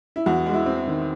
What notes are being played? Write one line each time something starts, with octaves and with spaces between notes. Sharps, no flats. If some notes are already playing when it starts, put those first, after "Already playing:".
E4
E2 F#4
G#3 F#4
E4
C4
D#3